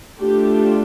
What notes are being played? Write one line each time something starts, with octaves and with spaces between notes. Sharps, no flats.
A3 D4 F4 G4